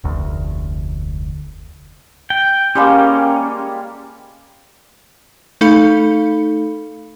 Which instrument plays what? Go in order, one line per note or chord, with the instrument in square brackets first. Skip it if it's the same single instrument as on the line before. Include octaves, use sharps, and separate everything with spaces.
[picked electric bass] F1 D2
[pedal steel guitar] G5
[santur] G3 G#3 A#3 [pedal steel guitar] C#4
[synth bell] A3 D#4 A4 F5 B5 C#7